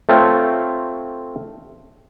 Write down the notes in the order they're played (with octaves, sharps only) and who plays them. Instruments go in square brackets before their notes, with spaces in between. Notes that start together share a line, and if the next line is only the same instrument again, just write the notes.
[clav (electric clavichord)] A3 C4 F4 C#5 G5